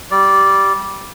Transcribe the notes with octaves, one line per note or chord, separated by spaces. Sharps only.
G3 D5